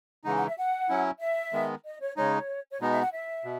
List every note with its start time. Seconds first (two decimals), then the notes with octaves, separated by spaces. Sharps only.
0.24 C#3 E3 G#3 D#4 F#5
0.36 F#5
0.46 E5
0.57 F#5
0.89 F#3 C#4 E4
1.20 E5
1.53 D#3 G#3 B3
1.85 D#5
2.00 C#5
2.16 C#3 G#3 D#4 C#5
2.70 C#5
2.80 B2 G#3 B3 D#4 D#5
2.91 E5
3.01 F#5
3.12 E5
3.44 B2